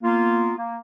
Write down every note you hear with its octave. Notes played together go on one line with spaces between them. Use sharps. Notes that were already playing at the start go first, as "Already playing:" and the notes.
A#3 B3 F4
A#3